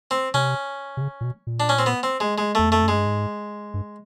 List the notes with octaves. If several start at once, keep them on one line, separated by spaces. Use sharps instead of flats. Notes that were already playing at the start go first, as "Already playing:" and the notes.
C4
C3 C#4
C3
C#3
A#2
B2
A#2
D4
C#4
C4
B3
C4
G#3
G#3
E2 A3
F2 A3
F#2
G#3
G2
G#2
G2